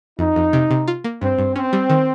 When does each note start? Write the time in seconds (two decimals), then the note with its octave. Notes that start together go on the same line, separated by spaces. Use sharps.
0.19 F2 D#4
0.36 F2
0.53 C3
0.71 C3
0.88 F4
1.04 A#3
1.21 G2 C4
1.38 G2
1.56 C4 C#4
1.73 G3
1.90 D#3